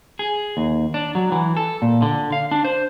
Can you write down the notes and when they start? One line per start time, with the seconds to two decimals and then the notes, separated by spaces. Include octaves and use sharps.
0.19 G#4
0.57 D#2
0.94 D4
1.15 F#3
1.32 E3
1.57 A4
1.82 A#2
2.02 D3
2.32 F5
2.51 D4
2.65 C5